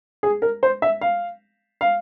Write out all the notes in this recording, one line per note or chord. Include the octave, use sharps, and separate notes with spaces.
G#4
A#4
C5
E5
F5
F5